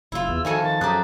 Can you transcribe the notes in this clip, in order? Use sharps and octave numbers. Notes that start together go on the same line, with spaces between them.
F#1 E4 F4 E6
E2
F2 D#3 F#4 A4 G#5
D#3 A6
F#2 G4 G#4 A#5 D#6 F#6